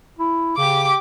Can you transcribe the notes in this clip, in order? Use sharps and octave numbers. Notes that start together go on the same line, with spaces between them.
E4
C#3 G4 D6